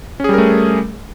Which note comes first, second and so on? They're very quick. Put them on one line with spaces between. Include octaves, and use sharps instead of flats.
C#4 G#4 G3 A#4 A3